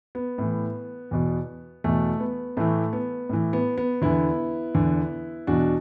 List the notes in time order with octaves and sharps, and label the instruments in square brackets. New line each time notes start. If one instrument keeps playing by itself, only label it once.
[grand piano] B3
A2 E3
E2 B2
E2 B2 A3
B3
A2 E3 A3
B3
A2 E3
B3
B3
E2 D3 B3 E4
E2 D3
E2 B2 D4 F#4